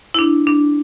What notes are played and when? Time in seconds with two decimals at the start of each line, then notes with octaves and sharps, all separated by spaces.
0.14 E4
0.19 D4
0.47 D4